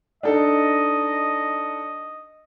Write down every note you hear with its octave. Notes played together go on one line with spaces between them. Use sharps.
D4 D#4 A4 D#5